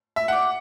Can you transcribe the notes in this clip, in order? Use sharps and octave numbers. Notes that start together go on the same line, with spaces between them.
E5
E4 G4 D5 F#5